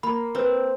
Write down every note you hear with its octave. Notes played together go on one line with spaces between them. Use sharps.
A#3 B5
C4 B4